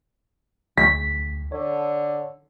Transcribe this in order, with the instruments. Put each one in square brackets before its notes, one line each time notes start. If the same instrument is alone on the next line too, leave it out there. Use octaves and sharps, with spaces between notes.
[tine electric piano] D2 [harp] B6
[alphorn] D3 [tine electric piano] C#5